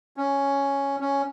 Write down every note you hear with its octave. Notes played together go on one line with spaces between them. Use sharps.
C#4
C#4